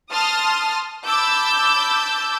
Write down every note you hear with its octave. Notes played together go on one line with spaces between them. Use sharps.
A5 C6 D#6 F6
A5 B5 D6 E6 G6